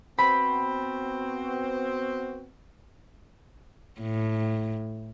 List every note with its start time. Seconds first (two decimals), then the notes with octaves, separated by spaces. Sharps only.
0.18 B3 C4 F#4 B5
4.01 A2